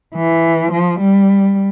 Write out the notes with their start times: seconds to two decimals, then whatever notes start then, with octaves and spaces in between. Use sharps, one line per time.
0.16 E3
0.72 F3
1.00 G3